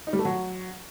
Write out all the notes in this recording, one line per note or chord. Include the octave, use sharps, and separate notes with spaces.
D#4
G3
A3
F#3